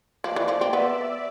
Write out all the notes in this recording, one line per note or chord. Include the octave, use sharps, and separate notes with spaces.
F3 D5
E3
F3
C4
B3 E5